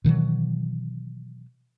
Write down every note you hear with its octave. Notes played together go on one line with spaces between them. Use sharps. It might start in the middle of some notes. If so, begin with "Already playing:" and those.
B2 D#3 E3 F#3